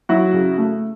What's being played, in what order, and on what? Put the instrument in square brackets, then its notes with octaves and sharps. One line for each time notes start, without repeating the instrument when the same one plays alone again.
[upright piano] F#3 E4 F#4
C#3
A3